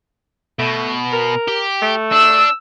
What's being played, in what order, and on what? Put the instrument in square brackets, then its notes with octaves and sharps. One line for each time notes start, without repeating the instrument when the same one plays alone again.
[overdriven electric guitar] B2 [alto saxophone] A3
[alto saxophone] A#4
[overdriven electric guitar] G4
[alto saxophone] A3
[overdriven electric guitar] D4 [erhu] E6